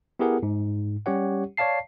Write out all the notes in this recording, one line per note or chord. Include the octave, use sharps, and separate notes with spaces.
B3 E4 G4 G#4 A#4 F#5
G#2
G3 C#4 G4 C#5 F#5
C#5 D5 F5 A5 C7